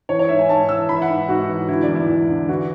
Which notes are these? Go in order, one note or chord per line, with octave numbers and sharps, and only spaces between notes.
E3 C#5
C#5
G#2 E5
G#5
G#2 A5
E3 E6
E3 B5
E5
F#5
G#2
G#2 F#4
E3
D3 E4
D5
E2
E4
E2
D3
E3 F#4